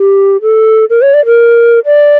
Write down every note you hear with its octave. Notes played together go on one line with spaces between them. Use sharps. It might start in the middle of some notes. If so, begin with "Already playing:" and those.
Already playing: G4
A4
A#4
C#5
D5
A#4
D5